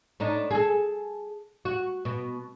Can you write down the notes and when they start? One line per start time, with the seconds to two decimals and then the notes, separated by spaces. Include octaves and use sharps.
0.20 A2 D4 D#4
0.51 G#4 A4
1.65 F#4
2.05 B2